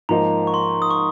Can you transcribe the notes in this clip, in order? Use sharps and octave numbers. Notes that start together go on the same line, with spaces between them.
G#2 F3 A#3 D#4 A#5
C#6
C6
D#6
C#6